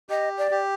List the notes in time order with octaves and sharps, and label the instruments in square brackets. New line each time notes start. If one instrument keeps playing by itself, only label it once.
[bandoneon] G4 [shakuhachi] D#5
[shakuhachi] D5
[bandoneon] G4